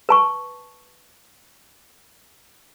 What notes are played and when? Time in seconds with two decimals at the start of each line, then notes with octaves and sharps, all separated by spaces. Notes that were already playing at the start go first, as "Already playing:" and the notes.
0.09 B4 A5 C#6